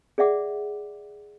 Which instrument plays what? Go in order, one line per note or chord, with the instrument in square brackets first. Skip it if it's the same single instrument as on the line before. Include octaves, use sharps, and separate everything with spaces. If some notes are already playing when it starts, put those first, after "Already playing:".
[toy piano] G#4 D5 E5 F#5 D6